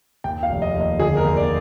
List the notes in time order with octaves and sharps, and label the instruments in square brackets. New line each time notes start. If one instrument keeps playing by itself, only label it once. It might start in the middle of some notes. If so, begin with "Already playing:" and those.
[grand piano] D#2 G5
F5
F1
D#5
D#2
D#5
D3 G#4
A#4
D#2
D5